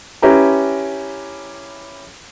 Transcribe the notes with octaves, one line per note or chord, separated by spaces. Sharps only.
C#4 E4 G4 B4 A#5